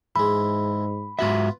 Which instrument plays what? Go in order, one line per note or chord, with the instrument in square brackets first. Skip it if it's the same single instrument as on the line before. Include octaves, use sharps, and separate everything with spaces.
[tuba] G#2 [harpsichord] E3 G#3 [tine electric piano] B5
[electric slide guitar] G#2 F#4 E5 [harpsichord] B3 F4